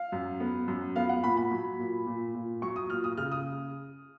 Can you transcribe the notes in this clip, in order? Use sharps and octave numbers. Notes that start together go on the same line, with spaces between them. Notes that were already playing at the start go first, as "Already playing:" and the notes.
Already playing: F5
F#2
B3
F#2
B3 F5
F#5
A#2 B5
B5
F#3
A#2
A#2
A#2
F#3 C#6
D#6
A#2 F6
D#6
C#3 F6
D#6